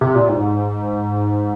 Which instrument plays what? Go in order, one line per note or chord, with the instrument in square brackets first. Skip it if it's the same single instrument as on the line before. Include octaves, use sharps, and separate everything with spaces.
[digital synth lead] C3
A#2
G#2